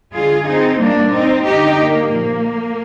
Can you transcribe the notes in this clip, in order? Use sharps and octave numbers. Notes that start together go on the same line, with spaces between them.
D3 G#3 F4 G#4
C4 D#4
A#2 G3 A#3 D4
C4 D#4
D3 G#3 D#4 G4
A#3
A#2 F3 A#3